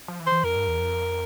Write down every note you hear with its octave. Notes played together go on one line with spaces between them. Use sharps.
F3
E3
C5
E3
F2 A#4
G2
E2
F2